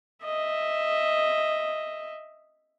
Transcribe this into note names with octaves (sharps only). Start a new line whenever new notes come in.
D#5 E5